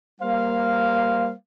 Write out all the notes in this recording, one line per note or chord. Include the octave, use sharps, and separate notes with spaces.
G3 A#3 C5 F5